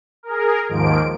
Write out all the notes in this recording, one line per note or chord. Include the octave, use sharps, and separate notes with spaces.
G#4 A#4
D#2 G#2 D#3 F3 A#3 D7